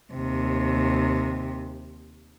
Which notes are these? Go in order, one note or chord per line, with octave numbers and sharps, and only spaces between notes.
D#2 C3